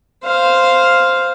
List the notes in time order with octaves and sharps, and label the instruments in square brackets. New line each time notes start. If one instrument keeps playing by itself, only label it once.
[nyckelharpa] C5 F5